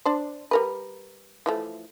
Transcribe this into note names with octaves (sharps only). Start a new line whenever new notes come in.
D4 C5
G3 A#4 B4
E3 F3 A3